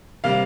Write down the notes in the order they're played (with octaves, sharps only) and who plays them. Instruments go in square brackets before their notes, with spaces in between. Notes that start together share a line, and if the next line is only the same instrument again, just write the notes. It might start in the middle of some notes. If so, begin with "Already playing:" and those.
[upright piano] C3 G3 A#3 F5